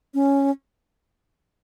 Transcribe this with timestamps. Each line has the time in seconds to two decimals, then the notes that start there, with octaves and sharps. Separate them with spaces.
0.14 C#4